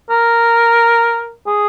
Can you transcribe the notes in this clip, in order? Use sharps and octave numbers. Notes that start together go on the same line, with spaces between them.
A#4
G#4